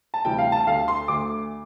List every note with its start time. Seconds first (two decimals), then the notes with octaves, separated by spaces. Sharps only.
0.14 A5
0.24 D2 C3 E3 G3 G5
0.38 F5
0.52 A5
0.67 D2 D3 A3 F5
0.88 C6
1.08 D2 D3 A3 D6